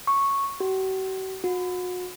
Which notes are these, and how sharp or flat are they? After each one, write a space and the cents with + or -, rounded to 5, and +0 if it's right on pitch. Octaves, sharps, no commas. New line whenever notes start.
C#6 -5
F#4 +45
F#4 -35